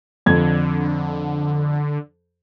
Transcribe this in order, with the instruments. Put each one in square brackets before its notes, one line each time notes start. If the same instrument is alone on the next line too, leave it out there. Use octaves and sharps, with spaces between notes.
[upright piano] F2 G#6 [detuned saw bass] D3